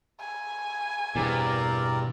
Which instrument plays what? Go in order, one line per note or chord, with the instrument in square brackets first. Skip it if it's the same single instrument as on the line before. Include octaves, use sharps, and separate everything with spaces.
[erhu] G#5
[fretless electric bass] E2 G2 [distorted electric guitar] B2 [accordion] C4 A#4 D5